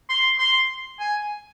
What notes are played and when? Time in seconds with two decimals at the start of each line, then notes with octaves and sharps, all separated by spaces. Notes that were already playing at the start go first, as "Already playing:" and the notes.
0.09 C6
0.39 C6
0.99 G#5